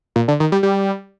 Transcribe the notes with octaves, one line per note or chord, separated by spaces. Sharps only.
A#2
D3
D#3
G3
G3